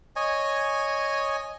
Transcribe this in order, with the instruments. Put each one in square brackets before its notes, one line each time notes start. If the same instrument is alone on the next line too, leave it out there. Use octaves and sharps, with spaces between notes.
[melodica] C#5 D#5 G#5